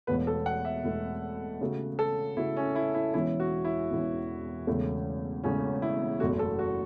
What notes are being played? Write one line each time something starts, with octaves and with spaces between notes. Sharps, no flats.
E1 E2 B2 A3 B4
A4
F#5
E5
E1 E2 B2 A3
C#3 A3 F#4
A4
C#3 A3 E4 F#4
C#4
E4
E4
E1 E2 E3 C#4 E4
F#4
E4
E1 E2 E3 C#4
E1 E2 C#3 A3
E1 E2 C#3 A3 C#4
E4
F#1 E2 B2 A3 F#4
A4
F#4